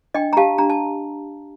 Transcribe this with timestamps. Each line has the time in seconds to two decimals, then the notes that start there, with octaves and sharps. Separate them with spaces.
0.14 D4 D#5 G5
0.33 A#5
0.37 G4 F5 A5
0.58 D4 A#5
0.70 A5